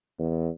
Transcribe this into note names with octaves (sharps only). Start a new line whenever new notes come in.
E2